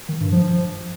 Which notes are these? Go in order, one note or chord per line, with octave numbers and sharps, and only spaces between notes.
D#3
G2
F3